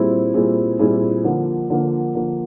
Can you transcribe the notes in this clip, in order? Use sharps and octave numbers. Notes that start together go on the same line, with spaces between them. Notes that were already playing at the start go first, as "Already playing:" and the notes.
Already playing: A#2 G3 C4 E4 G#4
A#2 G3 C4 E4 G#4
A#2 G3 C4 E4 G#4
D3 F3 A#3
D3 F3 A#3
D3 F3 A#3